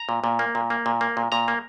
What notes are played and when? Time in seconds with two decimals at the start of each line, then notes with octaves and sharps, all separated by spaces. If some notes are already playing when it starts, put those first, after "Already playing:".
Already playing: A#5
0.09 A#2
0.24 A#2
0.39 A#3
0.55 A#2
0.70 A#3
0.86 A#2
1.01 A#3
1.17 A#2
1.32 A#2 A#5
1.48 A#3